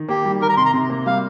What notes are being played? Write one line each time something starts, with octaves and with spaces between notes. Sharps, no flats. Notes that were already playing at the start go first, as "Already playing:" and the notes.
Already playing: D#3
A#3 G4
G3
D#3 A#4
A#5
C3 C6
A#5
C3
A#3
G3 F5